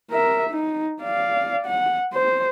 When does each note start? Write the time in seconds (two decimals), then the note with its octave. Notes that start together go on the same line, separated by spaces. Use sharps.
0.11 A#4 E5
0.50 D#4
1.02 D5 F5
1.67 F#5
2.13 C5